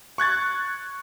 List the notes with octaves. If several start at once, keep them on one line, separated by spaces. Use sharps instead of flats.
C#6 F#6 G#6 A6